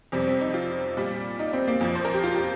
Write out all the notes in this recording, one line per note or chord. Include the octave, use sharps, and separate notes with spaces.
F2 C3 G3 C4
C4
D#4
F4
A#2 G3
D#4
C4
A#3
F2 F3
C5
A#4
G4
F4
G4